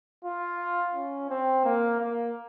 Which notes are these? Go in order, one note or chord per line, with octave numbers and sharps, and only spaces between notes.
F4
C#4
C4
A#3
A#3